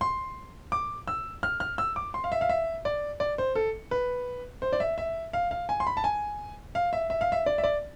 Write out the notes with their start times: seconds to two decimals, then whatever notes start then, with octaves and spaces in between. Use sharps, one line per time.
0.01 C6
0.72 D6
1.08 E6
1.43 F6
1.60 F6
1.78 E6
1.96 D6
2.14 C6
2.24 F5
2.32 E5
2.41 F5
2.49 E5
2.85 D5
3.20 D5
3.38 C5
3.55 A4
3.91 B4
4.62 C5
4.73 D5
4.80 E5
4.98 E5
5.33 F5
5.51 F5
5.69 G#5
5.80 C6
5.87 B5
5.97 A5
6.04 G#5
6.75 F5
6.93 E5
7.10 E5
7.21 F5
7.32 E5
7.46 D5
7.58 E5
7.64 D5